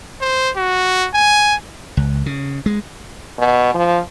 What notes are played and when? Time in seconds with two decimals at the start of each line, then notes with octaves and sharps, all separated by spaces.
0.21 C5
0.57 F#4
1.14 G#5
1.97 C#2
2.26 C#3
2.66 G#3
3.38 B2
3.74 F3